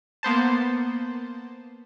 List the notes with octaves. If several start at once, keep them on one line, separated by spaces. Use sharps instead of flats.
A#3 B3 C5 A5